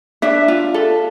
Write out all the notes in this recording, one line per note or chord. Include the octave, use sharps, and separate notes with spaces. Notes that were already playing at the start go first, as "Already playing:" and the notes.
D4 E5
F4
A4